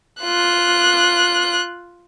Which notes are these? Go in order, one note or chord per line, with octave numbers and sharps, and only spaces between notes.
F4 F#6